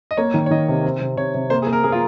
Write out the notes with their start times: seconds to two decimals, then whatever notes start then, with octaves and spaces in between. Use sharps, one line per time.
0.11 D#5
0.17 A#3 C#5
0.34 D#3
0.46 C#5
0.51 D#3 D#5
0.68 C3
0.84 C4
1.01 C3
1.17 C3 C#5
1.34 C3
1.50 A#3 C5
1.62 G#4
1.67 A#3
1.73 A#4
1.83 A#3 G#4
1.92 F4